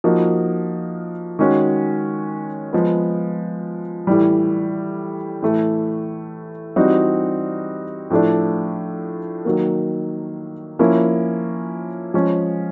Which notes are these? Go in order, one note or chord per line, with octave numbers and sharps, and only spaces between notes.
F3 A#3 D#4 F#4
D#3 G#3 C#4 F#4
F3 G#3 B3
A2 E3 G3
A2 E3 A3
E3 G3 C4 D#4 F#4
A2 F3 A3 D4
D#3 F#3 A#3
F3 A#3 C#4 E4
F3 G#3 C#4